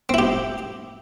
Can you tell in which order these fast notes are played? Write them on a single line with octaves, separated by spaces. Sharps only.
C4 E4 G4